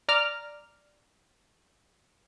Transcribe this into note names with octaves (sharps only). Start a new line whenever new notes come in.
D5 A#5 D6 F6